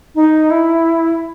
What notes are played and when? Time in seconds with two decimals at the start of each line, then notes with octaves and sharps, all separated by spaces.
0.15 D#4
0.50 E4